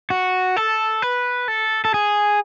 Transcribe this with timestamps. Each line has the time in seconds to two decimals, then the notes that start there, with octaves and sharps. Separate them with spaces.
0.10 F#4
0.56 A4
1.02 B4
1.48 A4
1.85 A4
1.94 G#4